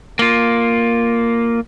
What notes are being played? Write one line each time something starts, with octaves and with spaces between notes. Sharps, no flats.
A#3 F4